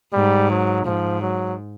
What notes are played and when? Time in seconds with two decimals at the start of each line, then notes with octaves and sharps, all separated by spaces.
0.13 G#2 G3
0.50 F#3
0.85 G#2 F3
1.22 F#3